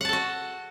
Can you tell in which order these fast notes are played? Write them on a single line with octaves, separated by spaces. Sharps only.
F#5 A5 A4 F#4